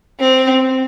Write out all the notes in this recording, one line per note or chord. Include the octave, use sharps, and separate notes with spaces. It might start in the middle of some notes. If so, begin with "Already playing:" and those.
C4